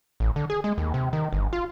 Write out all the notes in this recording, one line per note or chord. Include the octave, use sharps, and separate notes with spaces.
A1
D3
G#4
G#3
D#2
C3
D#3
G1
F4